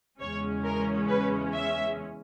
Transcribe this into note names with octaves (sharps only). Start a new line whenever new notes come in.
E2 C#3 G#3 C#4 C#5
A#4
B4
E5